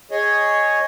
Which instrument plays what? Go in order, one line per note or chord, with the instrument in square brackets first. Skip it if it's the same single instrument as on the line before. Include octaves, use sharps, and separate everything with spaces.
[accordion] G#4 C#5 D#5